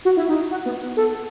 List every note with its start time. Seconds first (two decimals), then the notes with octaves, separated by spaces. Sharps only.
0.05 F#4
0.17 E4
0.29 D#4
0.51 F#4
0.66 B3
0.97 A4